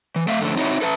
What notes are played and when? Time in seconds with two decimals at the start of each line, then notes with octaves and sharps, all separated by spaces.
0.16 E3
0.28 A3 E5 F5
0.42 F2 D3 A3
0.56 C4 D#4 E4 F#4 C#5
0.82 A4 B4 E5 A5